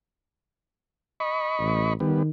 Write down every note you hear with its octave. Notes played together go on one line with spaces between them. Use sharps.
D#5 B5 C#6
A1
D#3 G3 B3